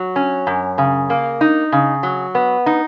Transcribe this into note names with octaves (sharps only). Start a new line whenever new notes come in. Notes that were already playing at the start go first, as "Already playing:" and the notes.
Already playing: F#3
C#4
F#2
C#3
A#3
D#4
C#3
F#3
B3
D#4